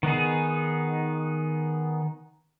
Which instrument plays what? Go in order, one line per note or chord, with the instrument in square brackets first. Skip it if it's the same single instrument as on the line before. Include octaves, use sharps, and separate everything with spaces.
[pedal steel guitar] D#3 B3 D#4 G#4